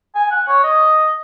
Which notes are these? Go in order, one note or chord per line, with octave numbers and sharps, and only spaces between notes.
G#5
F#5
C#5
D#5